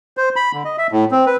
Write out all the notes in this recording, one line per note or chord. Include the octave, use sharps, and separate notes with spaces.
C5
B5
D3
D#5
E5
A2
C4
B4